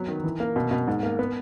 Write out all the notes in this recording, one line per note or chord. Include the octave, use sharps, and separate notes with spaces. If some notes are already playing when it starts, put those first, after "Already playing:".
Already playing: F#3 B3
D#3
E3
A#3
B2
B2
G#2
A#3
B3